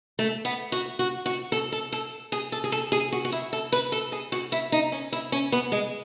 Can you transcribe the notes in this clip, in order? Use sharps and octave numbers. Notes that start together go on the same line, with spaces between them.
A3
B3
F#4
F#4
F#4
A4
A4
A4
G#4
A4
G#4
A4
G#4
F#4
F#4
E4
A4
B4
A4
G#4
F#4
E4
D#4
C#4
E4
C#4
B3
G#3